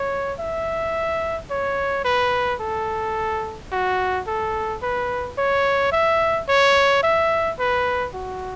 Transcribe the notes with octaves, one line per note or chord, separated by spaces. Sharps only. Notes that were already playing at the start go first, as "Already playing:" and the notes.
Already playing: C#5
E5
C#5
B4
A4
F#4
A4
B4
C#5
E5
C#5
E5
B4
F#4